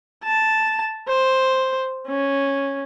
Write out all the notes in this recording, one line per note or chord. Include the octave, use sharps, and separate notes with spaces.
A5
C5
C#4